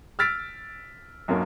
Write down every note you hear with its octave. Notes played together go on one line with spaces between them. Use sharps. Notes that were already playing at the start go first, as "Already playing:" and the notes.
E6 F6 A6 B6 D7
B1 F#2 F#3 A#3